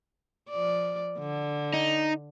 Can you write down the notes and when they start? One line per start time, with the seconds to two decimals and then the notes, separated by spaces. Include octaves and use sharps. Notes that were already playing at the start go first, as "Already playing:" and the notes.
0.50 F3 D5
1.18 D3
1.73 D#4